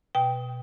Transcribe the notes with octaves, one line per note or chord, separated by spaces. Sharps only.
B2 G5